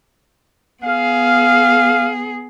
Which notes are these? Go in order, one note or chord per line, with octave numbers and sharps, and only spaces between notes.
B3 G#4 F5